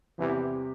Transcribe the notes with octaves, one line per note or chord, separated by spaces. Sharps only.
E2 C3 E3 G3 C4 G4